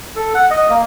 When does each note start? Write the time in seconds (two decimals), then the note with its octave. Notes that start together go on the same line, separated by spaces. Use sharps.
0.16 A4
0.34 F#5
0.51 D#5
0.70 A#3